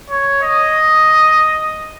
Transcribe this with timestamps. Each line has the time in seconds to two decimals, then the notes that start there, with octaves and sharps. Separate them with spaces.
0.10 C#5
0.43 D#5